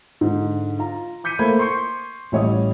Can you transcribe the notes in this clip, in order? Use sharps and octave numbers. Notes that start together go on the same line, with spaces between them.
G#2 D3
F4 A#5
D6 G6 B6 C#7 D#7
A3 A#3 A#4 C5 B5 G#6
C6 C#6 G6 C#7
A1 G3 C#5 D#5 D#6